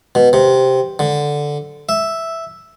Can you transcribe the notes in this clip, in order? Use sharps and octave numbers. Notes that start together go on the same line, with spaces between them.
B2
C3
D3
E5